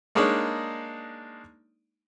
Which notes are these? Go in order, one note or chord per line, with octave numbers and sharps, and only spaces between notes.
G#3 A#3 D4 D#4 C#5 D5